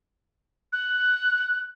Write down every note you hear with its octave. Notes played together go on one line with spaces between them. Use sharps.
F#6